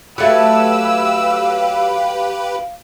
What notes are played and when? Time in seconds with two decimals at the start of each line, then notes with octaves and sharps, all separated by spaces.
0.18 F#3 A3 G4 B4 F5 E6